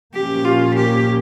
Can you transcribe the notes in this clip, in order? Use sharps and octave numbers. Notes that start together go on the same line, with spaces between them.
A#2 F3 A#3 C#4 G4
F4
G4